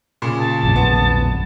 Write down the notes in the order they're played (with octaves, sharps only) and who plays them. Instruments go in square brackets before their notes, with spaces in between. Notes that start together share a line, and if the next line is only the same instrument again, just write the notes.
[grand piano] A#2 C#3
[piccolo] A5
[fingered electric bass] A#1 F#2
[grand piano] B3